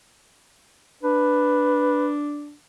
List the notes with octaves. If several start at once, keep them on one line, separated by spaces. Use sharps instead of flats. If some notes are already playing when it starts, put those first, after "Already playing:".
D4 B4